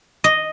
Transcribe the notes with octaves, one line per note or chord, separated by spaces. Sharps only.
D#5